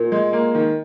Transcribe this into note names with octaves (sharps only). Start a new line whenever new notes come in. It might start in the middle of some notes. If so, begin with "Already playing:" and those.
Already playing: A#2 A#4
G#3
A#3
D#3